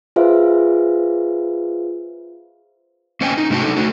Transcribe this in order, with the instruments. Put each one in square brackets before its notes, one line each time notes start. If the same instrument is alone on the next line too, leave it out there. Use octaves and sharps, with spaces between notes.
[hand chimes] F4 G#4 B4 C5 E5 F5
[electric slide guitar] A#3 C#4 C5 D#5 G5 G#5
D#4
G#2 C3 A3 D4 F#4 A5
D#4 A4
A3 F#4